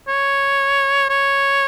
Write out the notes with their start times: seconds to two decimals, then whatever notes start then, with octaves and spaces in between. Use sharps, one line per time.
0.08 C#5
1.09 C#5